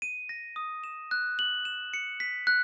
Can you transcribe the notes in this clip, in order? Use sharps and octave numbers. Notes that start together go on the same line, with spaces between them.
D#7
A#6
D#6
E7
F#6
F#7
E7
C#7
B6
F#6